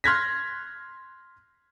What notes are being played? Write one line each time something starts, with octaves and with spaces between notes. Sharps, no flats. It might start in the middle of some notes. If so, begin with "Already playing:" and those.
C6 F6 F#6 G#6 A#6 B6